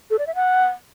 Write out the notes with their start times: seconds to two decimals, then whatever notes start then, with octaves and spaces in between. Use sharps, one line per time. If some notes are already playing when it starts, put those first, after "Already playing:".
0.11 A4
0.19 D5
0.27 E5
0.35 F#5